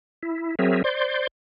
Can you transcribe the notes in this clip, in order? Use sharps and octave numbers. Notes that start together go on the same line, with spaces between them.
E4
F#3 C4 G#4 A#4 E5
C5 D5 C6 G6